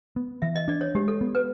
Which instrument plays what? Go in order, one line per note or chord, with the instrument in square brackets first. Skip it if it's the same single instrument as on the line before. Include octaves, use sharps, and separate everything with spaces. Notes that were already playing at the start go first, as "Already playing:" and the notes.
[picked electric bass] B3
[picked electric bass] E3 [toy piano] E5
[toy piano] D#5
[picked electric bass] D4 [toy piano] D5
[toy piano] C#5
[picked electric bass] G#3 [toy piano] G4
[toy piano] A4
[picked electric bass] B3
[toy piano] B4